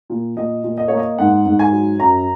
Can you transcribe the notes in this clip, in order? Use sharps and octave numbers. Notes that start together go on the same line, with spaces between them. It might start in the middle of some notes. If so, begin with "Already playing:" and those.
A#2
A#2 D#5
A#2
D#5
A#3 C#5
D#5
G#2 F#5
G#2
G#5
F#3
F#2 A#5